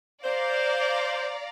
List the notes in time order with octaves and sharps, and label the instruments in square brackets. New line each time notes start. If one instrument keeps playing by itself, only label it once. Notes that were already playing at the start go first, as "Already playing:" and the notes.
[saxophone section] C5 [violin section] D5 F5 A#5